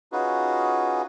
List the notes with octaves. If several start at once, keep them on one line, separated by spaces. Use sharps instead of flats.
C#4 D#4 F4 F#4 G#4 B4